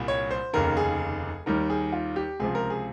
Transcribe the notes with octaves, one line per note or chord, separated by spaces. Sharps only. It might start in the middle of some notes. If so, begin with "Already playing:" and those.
Already playing: C2 A#2 G3
C#5
C5
F1 D#2 C#3 A#4
G#4
D#2 D#3 G3 A#4
G#4
F4
G4
C#2 C3 F3 G#4
A#4
G#4